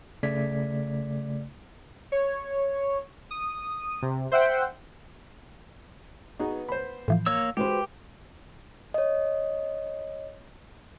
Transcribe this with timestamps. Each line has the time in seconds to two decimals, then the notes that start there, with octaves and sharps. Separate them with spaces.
0.23 C#3 A3 D5 G#6 B6
2.12 C#5
3.31 D#6
4.02 C3
4.32 C5 E5 F#5 G5
6.40 B3 D#4 F#4 G#4
6.69 C5 B5
7.08 A2 E3 F3
7.26 A#3 C#5 E6
7.57 G#3 F#4 G4 B4 C5
8.94 C#5 D#5